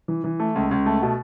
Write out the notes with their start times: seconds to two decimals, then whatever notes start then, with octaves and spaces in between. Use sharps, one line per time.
0.08 E3
0.24 E3
0.40 A3
0.55 C#2
0.71 C#2
0.86 A3
1.02 B2